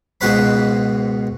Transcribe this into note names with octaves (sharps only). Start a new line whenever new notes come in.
C#2 G#2 B2 B4 C5 B5